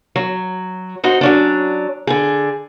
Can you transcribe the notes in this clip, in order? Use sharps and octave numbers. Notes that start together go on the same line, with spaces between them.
F#3
D#4 F#4 C5 D#5
F#3 C#4 D4
D3 G#4